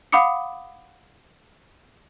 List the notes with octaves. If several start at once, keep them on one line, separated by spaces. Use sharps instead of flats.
F5 F#5 B5 D6 D#6 C#7